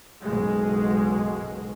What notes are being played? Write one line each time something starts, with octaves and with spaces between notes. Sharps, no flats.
F#1 B1 B2 G#3